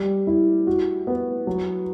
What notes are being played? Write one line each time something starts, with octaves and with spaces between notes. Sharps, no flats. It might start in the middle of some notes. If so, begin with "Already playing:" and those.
Already playing: G3
E4
F#4
B3
F#3